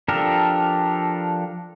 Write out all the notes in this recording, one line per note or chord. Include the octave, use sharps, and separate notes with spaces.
F3 D4 G4 A4 A#4